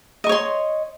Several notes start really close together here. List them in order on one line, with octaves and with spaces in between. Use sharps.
D#5 C#6 C#5 C6